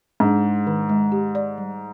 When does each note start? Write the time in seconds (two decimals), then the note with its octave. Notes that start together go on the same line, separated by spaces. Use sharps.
0.20 G#2 D4
0.43 G#4
0.67 D#3
0.89 G#3
1.12 G4
1.35 D5
1.58 G3